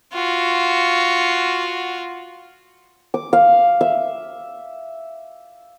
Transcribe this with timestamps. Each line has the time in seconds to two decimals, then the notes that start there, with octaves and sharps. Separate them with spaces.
0.14 F4 F#4
3.14 D6
3.33 F5
3.81 E5